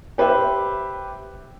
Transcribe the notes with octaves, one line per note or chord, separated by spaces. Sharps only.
G4 B4 C5 E5